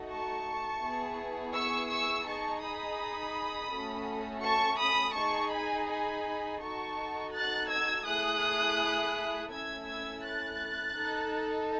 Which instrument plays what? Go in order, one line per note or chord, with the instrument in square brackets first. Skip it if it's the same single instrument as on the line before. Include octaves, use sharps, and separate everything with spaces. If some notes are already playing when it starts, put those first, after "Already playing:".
Already playing: [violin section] A3 D#4 F#4 A4
A5 C#6
B3 E4 G#4
C#6 E6
C#6 E6
D#4 G#4 A5 C#6
B5 D#6
A3 C#4 F#4 A4
A5 C#6
B5 D#6
D#4 G#4 A5 C#6
G#5 B5
G#5 B5
D#4 F#4 A4 A5 C#6
F#6 A6
E6 G#6
A3 E4 G#4 D#6 F#6
A3 C#4 E4 A4 E6 G#6
E6 G#6
F#6 A6
D#4 A4